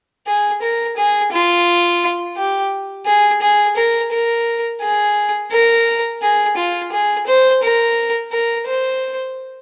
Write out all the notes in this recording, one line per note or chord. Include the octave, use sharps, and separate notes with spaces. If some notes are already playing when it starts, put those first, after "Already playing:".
G#4
A#4
G#4
F4
G4
G#4
G#4
A#4
A#4
G#4
A#4
G#4
F4
G#4
C5
A#4
A#4
C5